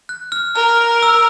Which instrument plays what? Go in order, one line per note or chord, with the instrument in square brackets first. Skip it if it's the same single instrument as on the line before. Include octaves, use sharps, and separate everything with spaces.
[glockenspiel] F#6
F6
[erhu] A#4 [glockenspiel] F6
[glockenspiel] E6